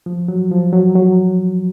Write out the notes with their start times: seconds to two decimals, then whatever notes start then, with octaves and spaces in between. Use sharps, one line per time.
0.06 F3
0.28 F#3
0.51 F3
0.73 F#3
0.95 F#3